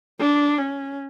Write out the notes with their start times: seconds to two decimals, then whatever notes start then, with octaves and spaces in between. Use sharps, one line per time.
0.20 D4
0.58 C#4